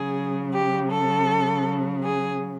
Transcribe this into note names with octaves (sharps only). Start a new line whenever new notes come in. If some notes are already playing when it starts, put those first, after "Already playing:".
Already playing: C#3 F#3 G#4
G4
A4
G#4